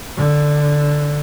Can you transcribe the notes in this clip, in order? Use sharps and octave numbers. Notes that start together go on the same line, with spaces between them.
D3